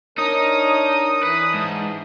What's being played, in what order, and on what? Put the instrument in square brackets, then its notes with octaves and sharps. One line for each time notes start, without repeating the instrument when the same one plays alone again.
[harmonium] D4 A#4 C#5 [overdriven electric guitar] D#4 [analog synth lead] D#6
[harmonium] E3 D4 [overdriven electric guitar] B4
[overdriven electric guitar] G#2